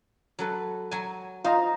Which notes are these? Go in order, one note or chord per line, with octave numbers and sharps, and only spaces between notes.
F#3 A4 B4
F#3 G#5
D#4 F4 C5 D#5 A#5